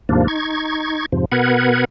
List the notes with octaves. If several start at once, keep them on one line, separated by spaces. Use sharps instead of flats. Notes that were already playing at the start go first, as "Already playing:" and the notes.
D#2 G#2 C3 F3 A#3 D4
D#4 C#6 G#6
F2 G#2 C3 F3
B2 B3 A#4 B4 F#5 G#6